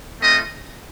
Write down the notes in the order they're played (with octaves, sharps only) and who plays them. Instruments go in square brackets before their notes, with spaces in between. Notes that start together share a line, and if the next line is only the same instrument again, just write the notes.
[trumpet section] A3 C4 F4 D#5